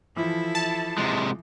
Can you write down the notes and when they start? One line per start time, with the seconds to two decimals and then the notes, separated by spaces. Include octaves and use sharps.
0.16 E3 F3 E4 A4
0.55 A5
0.98 C3 G#3